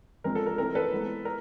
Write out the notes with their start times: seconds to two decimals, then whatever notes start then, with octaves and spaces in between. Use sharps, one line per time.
0.24 F3 G#3 C4 A#4
0.35 A4
0.46 A#4
0.58 E3 A3 C4 A#4
0.75 A4 B4
0.92 E3 G#3 B3
1.25 A#4